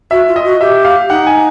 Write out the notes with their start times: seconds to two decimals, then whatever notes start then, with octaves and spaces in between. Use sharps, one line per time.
0.11 F#4 E5
0.28 F4
0.36 D#5
0.45 F#4
0.61 G4 E5
0.85 F5
1.09 D#4 F#5
1.27 G#5